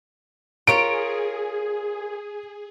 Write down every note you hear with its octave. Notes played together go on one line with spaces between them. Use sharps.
F4 G#4 A#4 C#5 D7